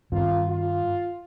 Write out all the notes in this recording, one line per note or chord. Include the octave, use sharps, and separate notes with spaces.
G2 D#3 C4 F4
F4